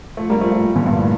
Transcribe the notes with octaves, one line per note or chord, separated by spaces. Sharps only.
F3 A3
G3 A#3
F3 A3
F3 A3
A#2 D3
G2 A#2
A2